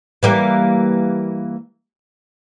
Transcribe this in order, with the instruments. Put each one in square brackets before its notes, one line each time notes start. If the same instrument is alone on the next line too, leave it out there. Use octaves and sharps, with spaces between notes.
[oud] E3 G3 A#3